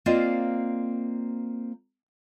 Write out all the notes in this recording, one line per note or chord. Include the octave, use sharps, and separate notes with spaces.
A#3 C4 F4 C5 D5 D#5